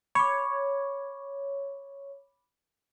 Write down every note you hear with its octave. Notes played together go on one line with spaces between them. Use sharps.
C#5 B5 D6